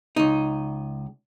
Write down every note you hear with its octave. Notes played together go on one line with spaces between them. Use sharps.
C#2 D#4